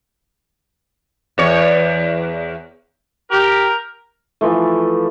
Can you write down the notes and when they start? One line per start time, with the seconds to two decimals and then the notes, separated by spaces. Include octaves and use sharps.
1.38 E2 C#5
3.31 G4 A#4
4.41 E3 F3 A3